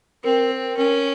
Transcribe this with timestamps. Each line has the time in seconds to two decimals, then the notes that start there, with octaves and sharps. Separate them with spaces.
0.24 C4 A#4
0.51 A#4
0.77 C#4 A#4